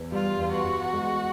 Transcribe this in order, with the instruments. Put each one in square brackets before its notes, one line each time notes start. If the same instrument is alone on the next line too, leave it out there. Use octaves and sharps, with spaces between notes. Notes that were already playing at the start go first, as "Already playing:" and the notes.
Already playing: [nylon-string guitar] E2
[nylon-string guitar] G3 [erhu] F4
[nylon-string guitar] E2
[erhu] F#4
[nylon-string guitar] E2
G#3